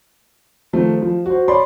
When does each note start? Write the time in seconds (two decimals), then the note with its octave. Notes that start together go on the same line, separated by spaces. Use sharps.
0.73 D#3 F3 A3 C4
1.02 F3
1.26 F#4 C5
1.48 C#5 D5 B5 C6